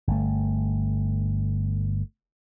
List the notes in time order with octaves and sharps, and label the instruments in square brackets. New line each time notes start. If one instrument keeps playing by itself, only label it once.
[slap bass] G1 A3